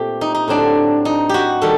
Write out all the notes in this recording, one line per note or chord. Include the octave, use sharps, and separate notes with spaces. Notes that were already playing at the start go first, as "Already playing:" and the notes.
Already playing: A#2 A3 C4 G4
D#4
D#4
A2 F#3 C4 D4
D#4
F#4 G4
D#3 G3 A4